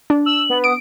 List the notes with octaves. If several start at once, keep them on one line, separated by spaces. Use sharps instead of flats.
D4
E6 F#7
B3
D#6 D7